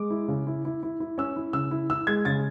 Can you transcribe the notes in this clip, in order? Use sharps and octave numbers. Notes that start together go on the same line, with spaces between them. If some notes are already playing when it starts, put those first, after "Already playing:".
Already playing: G#3 D6
E4
C#3
E4
E4
E4
E4
C#4 E6
E4
C#3 E6
E4
E4 E6
G#3 G#6
C#3 A6